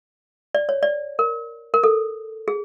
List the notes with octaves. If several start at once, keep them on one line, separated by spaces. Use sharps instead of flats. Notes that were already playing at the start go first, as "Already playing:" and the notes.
D5
C#5
D5
A#4
A#4
A4
G#4